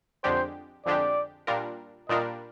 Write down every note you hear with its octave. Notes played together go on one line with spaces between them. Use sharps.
F2 D3 G#3 D4 G4 C5
F2 D3 G#3 D4 G4 D5
A#2 G3 D4 F4 A#4
A#2 G3 D4 F4 A#4 D#5